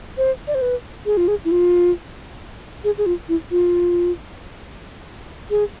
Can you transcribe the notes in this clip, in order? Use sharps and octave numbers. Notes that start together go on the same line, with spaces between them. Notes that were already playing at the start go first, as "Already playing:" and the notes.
C5
D5
C5
B4
G#4
F4
G#4
E4
F4
G#4
G#4
F4
E4
F4
G#4